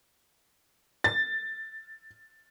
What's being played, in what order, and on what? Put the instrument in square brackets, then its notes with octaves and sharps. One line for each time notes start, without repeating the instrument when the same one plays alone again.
[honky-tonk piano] A6